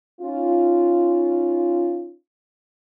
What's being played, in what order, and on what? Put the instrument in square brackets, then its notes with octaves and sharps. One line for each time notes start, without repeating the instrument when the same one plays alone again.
[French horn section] C#4 D#4 F4